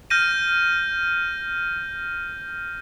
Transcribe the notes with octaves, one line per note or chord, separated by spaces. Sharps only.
F6 G6 A#6 D#7